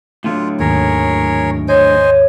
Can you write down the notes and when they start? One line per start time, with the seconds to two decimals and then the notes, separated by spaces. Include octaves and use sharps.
0.24 A2 D3 F#3 F4
0.59 D#2 G#2 D#3 G#4 A#4 C#5
1.68 C5 C#5 D#5 G#5